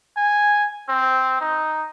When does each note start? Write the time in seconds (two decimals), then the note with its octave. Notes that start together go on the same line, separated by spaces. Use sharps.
0.17 G#5
0.89 C4
1.41 D#4